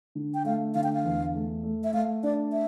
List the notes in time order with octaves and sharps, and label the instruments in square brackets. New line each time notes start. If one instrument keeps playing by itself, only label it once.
[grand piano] D3
[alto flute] G5
[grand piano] A3 [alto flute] F5
[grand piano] D3 [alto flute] F5
[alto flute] G5
F5
[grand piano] E2
A3
A3
[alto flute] E5
[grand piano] A3 [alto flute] F5
[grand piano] D4 [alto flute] D5
[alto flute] E5